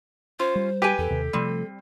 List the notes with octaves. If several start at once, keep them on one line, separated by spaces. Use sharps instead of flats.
C#4 F4 C5
G3
G4 B4 G5 G#5
E2 A4
D#2 C3
C3 F3 G3 A3 C4